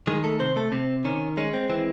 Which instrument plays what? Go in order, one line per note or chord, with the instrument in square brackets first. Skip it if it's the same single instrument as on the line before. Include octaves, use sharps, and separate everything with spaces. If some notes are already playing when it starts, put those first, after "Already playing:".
[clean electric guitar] D#3 G#3 G#4
A3 A4
C3 C4 C5
A3 A4
C3 C4
D#3 C#4
G#3 C#4
C4
E3 C4